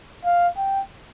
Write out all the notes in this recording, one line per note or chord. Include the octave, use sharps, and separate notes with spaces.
F5
G5